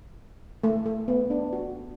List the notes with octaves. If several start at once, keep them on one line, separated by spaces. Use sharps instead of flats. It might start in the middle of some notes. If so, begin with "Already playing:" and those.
A3
A3
B3
D4
F#4